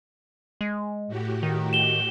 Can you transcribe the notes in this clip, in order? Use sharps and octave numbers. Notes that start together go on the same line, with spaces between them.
G#3
A2 F#4 G4
D#3
E7 G7